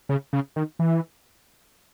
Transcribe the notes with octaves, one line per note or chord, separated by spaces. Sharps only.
C#3
C#3
D#3
E3